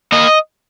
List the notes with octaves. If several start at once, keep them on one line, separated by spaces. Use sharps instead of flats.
A#3 D#5